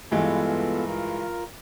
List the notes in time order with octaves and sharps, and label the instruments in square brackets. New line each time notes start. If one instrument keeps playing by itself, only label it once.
[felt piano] G2 E3 G#3 [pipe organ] B3 F4 A4
[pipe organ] F4 A#4